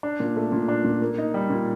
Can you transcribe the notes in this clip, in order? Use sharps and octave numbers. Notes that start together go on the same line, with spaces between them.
D4
A#2
A3
A#2
D4
A#2
A#3
D#4
G3
A#2